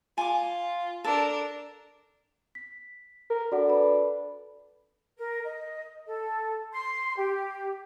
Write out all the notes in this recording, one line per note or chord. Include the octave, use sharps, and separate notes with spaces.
F4 G#5 D6
D4 A4 A#4
B6
A#4
D4 F#4 A4 F#5
A4 B4 B5
A#4
D#5
A4
C6
G4